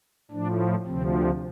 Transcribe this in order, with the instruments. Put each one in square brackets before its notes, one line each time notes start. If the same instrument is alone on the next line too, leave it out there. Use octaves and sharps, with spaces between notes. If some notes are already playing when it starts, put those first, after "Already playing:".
[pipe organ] A2 F3 D4
D2 C3 F3 C4